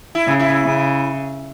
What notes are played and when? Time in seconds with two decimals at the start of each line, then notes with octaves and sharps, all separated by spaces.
0.15 E4
0.27 C#3
0.40 E4
0.65 C#3